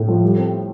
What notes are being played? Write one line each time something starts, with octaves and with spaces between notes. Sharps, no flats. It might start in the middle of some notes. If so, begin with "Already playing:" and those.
Already playing: A2
F3
G3
C4